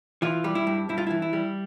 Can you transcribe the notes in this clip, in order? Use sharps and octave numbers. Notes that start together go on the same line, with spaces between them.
E3 F4
G3
E4
G2
G2 E4
F4
E3 E4
E4
G3